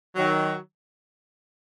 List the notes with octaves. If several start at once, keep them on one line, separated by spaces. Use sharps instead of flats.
D#3 F#3